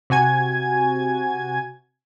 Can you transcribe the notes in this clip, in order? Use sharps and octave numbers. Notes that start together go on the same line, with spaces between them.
C3 F#4 G#5 G#6